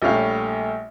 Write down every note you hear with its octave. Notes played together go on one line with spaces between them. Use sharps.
A#1 G3 A3 G4 C#5 F5